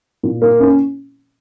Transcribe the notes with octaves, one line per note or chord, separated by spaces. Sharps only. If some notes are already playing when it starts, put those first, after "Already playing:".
A#2
A#3
C#4